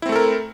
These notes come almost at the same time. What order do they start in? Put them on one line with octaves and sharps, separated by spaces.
E4 C4 A3 A4 A#4